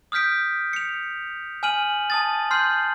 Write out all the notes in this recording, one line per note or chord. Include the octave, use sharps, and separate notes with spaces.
D#6 F6 G6 B6 D7
C#7 F7
G#5 F6 D#7 F#7
A5 D#6 A6
C6 F6 G6 C7